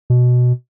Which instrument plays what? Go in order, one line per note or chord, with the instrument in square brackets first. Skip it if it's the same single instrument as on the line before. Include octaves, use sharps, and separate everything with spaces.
[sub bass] B2